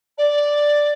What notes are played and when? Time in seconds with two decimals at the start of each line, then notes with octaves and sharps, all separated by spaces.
0.18 D5